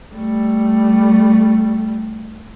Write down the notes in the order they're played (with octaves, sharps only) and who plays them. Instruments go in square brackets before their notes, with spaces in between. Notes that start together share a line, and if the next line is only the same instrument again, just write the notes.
[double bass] G3 A3